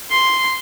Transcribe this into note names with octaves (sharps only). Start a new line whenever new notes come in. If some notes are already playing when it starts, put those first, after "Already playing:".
C6